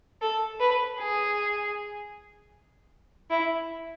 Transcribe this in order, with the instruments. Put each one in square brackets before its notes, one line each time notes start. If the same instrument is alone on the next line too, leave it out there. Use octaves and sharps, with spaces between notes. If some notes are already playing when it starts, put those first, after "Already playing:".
[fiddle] A4
B4
G#4
E4